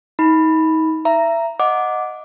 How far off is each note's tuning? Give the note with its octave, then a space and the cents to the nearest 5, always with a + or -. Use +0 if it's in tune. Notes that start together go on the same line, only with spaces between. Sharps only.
D#4 +30 B5 +0
E5 +25 A#5 +0
D#5 +0 F#5 -15 D6 +0